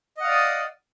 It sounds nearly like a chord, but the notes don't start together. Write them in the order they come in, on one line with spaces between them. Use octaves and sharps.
D#5 F#5 F5 D5 D#6